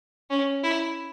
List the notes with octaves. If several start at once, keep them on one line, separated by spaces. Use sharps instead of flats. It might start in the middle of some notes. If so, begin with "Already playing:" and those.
C#4
E4